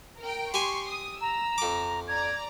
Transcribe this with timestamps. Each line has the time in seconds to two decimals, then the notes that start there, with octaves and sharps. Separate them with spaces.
0.20 A#4 G5
0.54 G4 G#5 C6 C#6
0.90 D#6
1.21 A#5 E6
1.58 F2 D6
2.08 D5 A#5 G#6